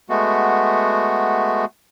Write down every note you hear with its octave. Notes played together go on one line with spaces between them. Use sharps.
G#3 A3 B3 F#4